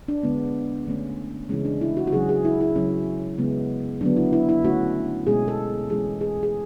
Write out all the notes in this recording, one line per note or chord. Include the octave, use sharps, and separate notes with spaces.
D4
D3 G#3 B3
D3 A3 C#4
C#3 E3 G#3 C#4
D4
E4
F#4
F#4
C#3 F#3 C#4 G#4
G#4
E4
E4
C#3 F#3 C#4
C#3 G#3 B3
D3 F#3 B3 D4
E4
E4
E4
D3 A3 C#4 F#4
B2 G#3 C#4 G#4
A4
E3 G#3 C#4 G#4
G#4
G#4